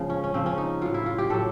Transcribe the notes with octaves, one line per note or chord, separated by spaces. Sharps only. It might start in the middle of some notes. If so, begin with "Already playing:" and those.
Already playing: C#3 F3 G#3
C#4
C#4
C#3 F3 C4
C#4
D#4
A2 F#3 F4
E4
F4
G4
A2 F#3 A4